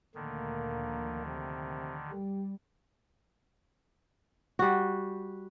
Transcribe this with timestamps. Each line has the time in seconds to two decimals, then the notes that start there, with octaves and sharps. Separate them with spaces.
0.15 D2 A#2 D3 D#3 F3 A#3
1.26 C3
2.10 G3 G4
4.59 G3 F#4